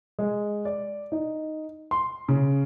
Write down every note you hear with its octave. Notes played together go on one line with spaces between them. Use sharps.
G#3
D5
D#4
C6
C#3